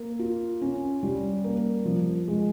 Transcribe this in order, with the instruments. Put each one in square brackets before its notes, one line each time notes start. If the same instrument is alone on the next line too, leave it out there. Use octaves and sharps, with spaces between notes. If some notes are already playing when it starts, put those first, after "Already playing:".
Already playing: [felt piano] A#3
F4
C#4
G3
A#3
F3
G#3